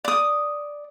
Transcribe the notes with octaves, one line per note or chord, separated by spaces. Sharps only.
D5 D#6